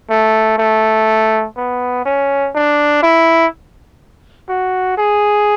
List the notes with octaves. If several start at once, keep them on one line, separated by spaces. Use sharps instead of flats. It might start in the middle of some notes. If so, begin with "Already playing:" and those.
A3
A3
B3
C#4
D4
E4
F#4
G#4